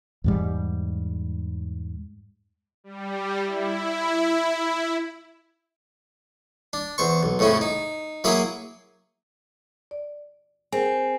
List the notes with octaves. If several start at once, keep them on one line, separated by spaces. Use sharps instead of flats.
E2 G#2 G3
G3
E4
D4
E2 C5 C#6
B1
F2 A2 C#3 C#4 E4
D#4
F#3 A#3 E4 G#4 B5 D#6
D5
C4 G#4 A#4 G5 G#5